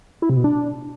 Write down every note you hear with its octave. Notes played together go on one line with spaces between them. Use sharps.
E4
C3
B2
D4